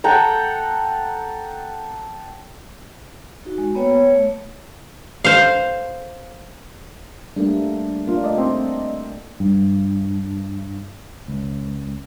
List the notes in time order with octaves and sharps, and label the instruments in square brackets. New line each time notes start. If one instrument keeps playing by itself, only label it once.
[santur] A4 F#5 G5 A#5
[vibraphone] D#4 F#4
G#3
A#3 B3 B4 C#5 G5
C#5
A3
[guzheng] C5 F5
[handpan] G3 A3 A#3 [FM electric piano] D4
[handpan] A#3 D4 [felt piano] F4
[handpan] A3 [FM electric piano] D5 D#5
[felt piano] C4
[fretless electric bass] G2
C#2